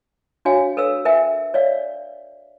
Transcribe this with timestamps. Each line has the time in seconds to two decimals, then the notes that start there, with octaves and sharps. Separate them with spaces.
0.45 D4 F#4 C#5 F5 G#5
0.77 A4 B4 C#5 F5 E6
1.05 A#4 B4 E5 G5 G#5
1.54 C#5 D5 F5